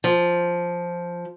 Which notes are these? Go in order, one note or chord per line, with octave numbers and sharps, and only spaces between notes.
F3